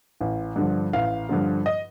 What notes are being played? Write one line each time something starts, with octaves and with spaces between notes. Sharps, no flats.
A1
G2 D3 F3
A1 F5
G2 D3 F3
D#5